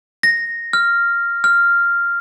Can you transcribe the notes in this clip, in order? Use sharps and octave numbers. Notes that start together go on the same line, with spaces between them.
A#6
F6
F6